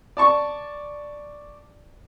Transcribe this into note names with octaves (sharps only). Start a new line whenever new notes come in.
D5 A5 C#6